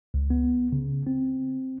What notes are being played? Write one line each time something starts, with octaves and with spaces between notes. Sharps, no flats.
C#2
B3
C#3
C4